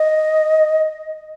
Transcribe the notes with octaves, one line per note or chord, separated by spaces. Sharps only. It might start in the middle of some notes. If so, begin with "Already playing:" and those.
Already playing: D#5